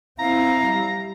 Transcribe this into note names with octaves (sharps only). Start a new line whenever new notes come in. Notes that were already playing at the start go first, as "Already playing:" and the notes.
C4 E4 F5 A#5
G3